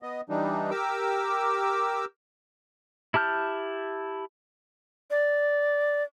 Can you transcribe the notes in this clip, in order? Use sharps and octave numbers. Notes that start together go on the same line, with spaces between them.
B3 D#5
E3 G3 D4 D#4
G4 A#4 D6 E6
E4 G4 A5 F6 G6
D5